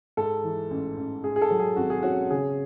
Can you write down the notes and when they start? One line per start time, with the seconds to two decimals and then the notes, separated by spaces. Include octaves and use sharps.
0.17 G#2 A4
0.43 E3
0.70 A1
0.97 A1
1.24 G#2 G#4
1.36 G#4
1.42 A4
1.50 F#3
1.59 G#4
1.76 G#1 F#4
1.90 G#4
2.03 C#4 F#4
2.31 C#3 G#4